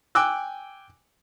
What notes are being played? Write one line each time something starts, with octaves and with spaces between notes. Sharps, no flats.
G5 G#5 D6 E6 F#6